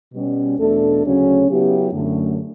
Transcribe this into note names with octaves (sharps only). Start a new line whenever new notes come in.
B2 G3 C#4
E2 B2 A3 D4 A4
D2 C#3 F#3 C#4
C#3 F#3 B3 E4 G4
F#2 D3 A3